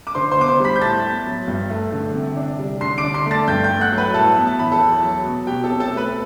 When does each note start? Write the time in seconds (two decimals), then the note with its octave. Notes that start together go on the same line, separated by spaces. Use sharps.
0.07 D6
0.15 D3 C5 C6
0.31 C5 C6
0.37 B3 D6
0.48 C5 C6
0.60 G3 B5 B6
0.76 G6
0.81 A2 A5 A6
1.04 B3
1.26 F#3
1.48 G2
1.70 A3
1.92 D3
2.14 C3
2.37 D4
2.59 G3
2.81 D3 C6 C7
2.98 D6 D7
3.03 D4
3.14 C6 C7
3.26 A3
3.31 A5 A6
3.47 G2 G5 G6
3.64 G5 G6
3.69 A3
3.81 F#5 F#6
3.92 F#3
3.98 B4 B5
4.14 A2 A4 A5
4.36 B3
4.47 A5
4.58 E3 B5
4.72 A4 A5
4.80 E2
5.03 F#3
5.25 B2
5.47 B2 G4 G5
5.64 A4 A5
5.69 C4
5.80 A4 A5
5.91 A3
5.97 B4 B5